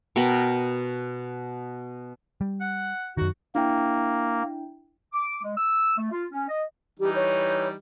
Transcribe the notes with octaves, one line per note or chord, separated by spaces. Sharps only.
B2 A#4 G5 B5
G3
F#5
F#2 D#3 F#4
A#3 D4 E4 G5
D6
G#3
E6
A3
F4
C#4
D#5
E3 G3 D#4 G4
C#5